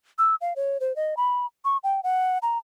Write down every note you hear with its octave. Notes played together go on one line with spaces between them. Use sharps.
E6
F5
C#5
C5
D#5
B5
C#6
G5
F#5
A#5